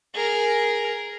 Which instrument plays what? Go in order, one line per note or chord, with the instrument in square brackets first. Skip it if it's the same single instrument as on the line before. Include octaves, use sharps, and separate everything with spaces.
[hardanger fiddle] G#4 A#4